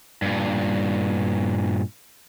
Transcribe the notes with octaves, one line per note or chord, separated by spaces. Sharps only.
G2 A#2